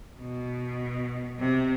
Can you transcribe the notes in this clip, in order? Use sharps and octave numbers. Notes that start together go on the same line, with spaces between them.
B2
C3